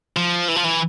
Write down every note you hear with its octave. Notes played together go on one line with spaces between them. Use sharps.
F3
E3
F3
E3